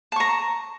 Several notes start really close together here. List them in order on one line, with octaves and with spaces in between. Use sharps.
A5 C#6 A#5